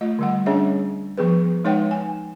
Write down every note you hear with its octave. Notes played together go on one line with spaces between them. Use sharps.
A3 F4 D#5
D3 G3 F#5
G3 C#4 D4 G#4 C#5 E5
F3 B3 G#4 B4
G#3 D#4 B4 C#5 F#5 G5
G#5